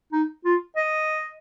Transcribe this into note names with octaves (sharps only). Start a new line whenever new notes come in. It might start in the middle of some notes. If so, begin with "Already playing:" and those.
D#4
F4
D#5